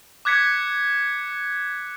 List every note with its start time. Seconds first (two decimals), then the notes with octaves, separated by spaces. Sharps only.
0.25 D6 F#6 G#6 B6 C#7